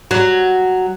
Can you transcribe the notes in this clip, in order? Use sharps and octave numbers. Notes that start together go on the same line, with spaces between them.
F#3